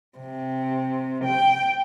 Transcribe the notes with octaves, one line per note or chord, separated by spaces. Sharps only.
C3
G5